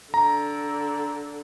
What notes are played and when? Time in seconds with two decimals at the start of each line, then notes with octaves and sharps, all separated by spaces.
0.14 D3 A#5